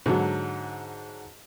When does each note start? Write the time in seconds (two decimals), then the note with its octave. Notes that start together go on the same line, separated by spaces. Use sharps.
0.06 G#2 D3 F#3